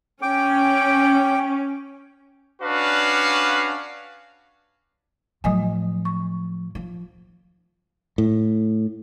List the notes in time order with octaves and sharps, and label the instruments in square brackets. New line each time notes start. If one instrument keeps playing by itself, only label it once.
[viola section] C#4 [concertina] G5 D6
[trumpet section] C#4 D4 F#4 B4 F5
[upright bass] A2 F3 [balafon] F#3 D#5 G#5
[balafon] C#6
[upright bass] F3
[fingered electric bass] A2